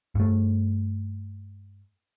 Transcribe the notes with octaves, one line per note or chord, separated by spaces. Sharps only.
G2 A3